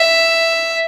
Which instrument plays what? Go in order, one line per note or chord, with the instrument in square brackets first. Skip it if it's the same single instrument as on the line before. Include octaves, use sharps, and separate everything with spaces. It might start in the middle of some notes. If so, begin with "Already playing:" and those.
Already playing: [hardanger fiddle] E5